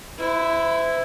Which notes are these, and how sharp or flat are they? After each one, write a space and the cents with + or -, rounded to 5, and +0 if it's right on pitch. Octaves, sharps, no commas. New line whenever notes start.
E4 +0 C5 -40